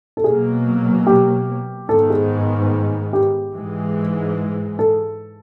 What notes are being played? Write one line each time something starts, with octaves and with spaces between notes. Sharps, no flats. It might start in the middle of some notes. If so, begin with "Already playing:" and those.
A4
B2 F#3 A#3 G#4
G4
G#2 D#3 G#3 B3 A4
G#4
G4
G#2 E3 G#3
A4